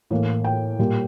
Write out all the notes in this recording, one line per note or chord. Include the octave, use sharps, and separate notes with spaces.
A2 E3 A#3
G5
A#2 G3 A#3